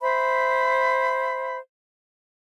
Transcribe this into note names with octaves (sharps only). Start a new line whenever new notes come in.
C5 E5 B5